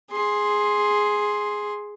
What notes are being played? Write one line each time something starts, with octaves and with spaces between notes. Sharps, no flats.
G#4 C6